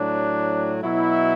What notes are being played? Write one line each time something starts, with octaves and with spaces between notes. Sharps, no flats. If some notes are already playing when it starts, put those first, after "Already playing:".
Already playing: A2 F#3 D4
B2 F#3 E4